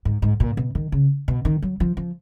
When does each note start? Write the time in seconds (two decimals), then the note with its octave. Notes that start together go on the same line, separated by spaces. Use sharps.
0.05 G#2
0.22 G#2
0.40 A#2
0.57 B2
0.75 D#3
0.92 C#3
1.28 B2
1.45 D#3
1.62 F#3
1.80 F3
1.97 F3